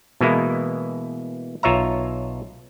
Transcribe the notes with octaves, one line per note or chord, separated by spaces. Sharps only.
B2 E3 G#3 A#3 E4
B1 F4 C#5 E5 A#5